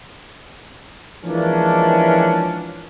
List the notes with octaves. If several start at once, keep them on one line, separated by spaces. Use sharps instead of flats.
E3 F3 G#3 A#3 C#4 D4